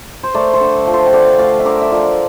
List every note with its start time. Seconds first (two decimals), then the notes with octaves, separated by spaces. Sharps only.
0.23 C5
0.34 A3 A#4 D5
0.53 A4 C5
0.61 D3
0.87 F3
0.93 A4 C5
1.07 G5
1.13 D3 D5 F5
1.39 A3 D5 F5
1.59 E5
1.65 D3 A#4 D5
1.82 E5
1.91 F3 A#4 D5